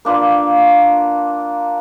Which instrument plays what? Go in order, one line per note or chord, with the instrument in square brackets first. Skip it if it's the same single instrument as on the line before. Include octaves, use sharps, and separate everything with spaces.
[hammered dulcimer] A#3 D4 F4 B4